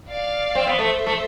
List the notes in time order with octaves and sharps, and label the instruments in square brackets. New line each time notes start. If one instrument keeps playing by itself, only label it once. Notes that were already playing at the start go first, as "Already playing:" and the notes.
[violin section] D5 F5
[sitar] C4
B3
[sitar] A3 [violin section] C5 E5
[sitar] A3